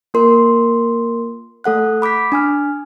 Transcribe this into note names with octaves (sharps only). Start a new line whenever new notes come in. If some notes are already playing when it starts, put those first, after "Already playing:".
A#3 F4 A#4 C6
A3 A4 F#5 F#6
B5 D6 G6 B6
D4 G#5 F6